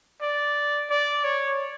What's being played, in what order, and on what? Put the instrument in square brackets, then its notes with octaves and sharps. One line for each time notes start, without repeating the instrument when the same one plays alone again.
[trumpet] D5
D5
C#5